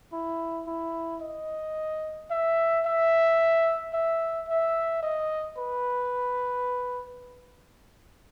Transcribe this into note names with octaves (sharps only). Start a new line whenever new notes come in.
E4
E4
D#5
E5
E5
E5
E5
D#5
B4